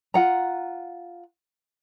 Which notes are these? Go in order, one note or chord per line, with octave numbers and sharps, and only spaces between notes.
F4 F#5 A#5